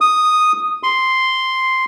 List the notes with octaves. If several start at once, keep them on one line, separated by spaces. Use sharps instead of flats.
D#6
C6